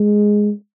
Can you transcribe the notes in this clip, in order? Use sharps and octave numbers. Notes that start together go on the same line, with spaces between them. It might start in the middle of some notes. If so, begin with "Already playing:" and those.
Already playing: G#3